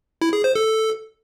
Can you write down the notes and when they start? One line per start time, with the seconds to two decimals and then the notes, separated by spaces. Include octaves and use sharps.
0.22 E4
0.33 G#4
0.44 C5
0.55 A4